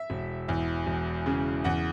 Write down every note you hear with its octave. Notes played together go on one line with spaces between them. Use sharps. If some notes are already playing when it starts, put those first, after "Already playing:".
Already playing: E5
E1
E2
E1
C#3
E2 F#5